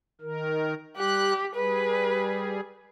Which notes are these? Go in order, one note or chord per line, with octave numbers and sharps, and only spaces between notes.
D#3 A#4
G3 G4 F#6
G3 G#4 B4